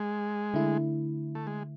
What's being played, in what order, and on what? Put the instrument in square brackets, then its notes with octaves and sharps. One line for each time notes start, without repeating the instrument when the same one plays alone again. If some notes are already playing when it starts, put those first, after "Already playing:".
Already playing: [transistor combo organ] G#3
[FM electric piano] D3 A3 E4
[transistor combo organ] A3
G#3